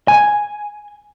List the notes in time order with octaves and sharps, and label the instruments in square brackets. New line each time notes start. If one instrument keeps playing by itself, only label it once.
[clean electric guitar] G#5